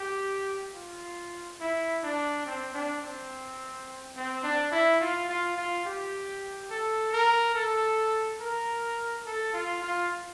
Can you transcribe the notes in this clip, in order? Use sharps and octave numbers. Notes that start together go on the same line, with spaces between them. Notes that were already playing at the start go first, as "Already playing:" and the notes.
Already playing: G4
F4
E4
D4
C4
D4
C4
C4
D4
E4
F4
F4
F4
G4
A4
A#4
A4
A#4
A4
F4
F4